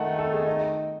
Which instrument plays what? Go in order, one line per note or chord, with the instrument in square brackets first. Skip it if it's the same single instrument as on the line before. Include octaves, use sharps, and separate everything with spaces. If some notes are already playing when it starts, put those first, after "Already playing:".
Already playing: [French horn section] D#3 A3 D#4 [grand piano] F#5 A5
[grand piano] A4
G#4
D#5